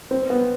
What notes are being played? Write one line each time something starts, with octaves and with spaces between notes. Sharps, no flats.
C4
B3